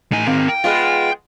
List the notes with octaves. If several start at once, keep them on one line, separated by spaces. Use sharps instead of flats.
A2 D#4 G#5
D#3 A#3 C4
G5
G#3 B3 F4